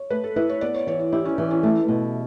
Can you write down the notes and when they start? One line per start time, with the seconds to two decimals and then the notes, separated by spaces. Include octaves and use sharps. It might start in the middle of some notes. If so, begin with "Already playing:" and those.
Already playing: C#5
0.10 A3 B4
0.24 A4
0.36 E4 B4
0.49 C#5
0.61 B3 D5
0.75 C#5
0.87 E3 C#5
0.99 C#5
1.12 E4 G4
1.25 C#4
1.38 E3 C#4
1.51 C#4
1.63 A3 E4
1.88 B2